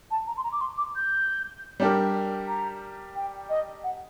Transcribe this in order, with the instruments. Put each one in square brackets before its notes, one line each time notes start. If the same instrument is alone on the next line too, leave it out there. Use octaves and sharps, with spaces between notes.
[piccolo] A5
A#5
C6
A#5
D6
C6
D6
G6
[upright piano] G3 D4 G4 A#4
[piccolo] A#5
G5
D#5
F#5